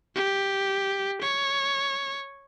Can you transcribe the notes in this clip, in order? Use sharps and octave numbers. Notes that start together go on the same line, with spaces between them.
G4
C#5